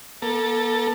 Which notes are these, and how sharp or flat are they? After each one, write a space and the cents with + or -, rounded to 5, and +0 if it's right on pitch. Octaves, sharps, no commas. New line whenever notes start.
A#3 +45 A4 +10